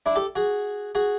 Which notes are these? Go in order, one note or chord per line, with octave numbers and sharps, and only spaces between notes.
D4 E4
G4 A4
F#4 G#4
F#4 G#4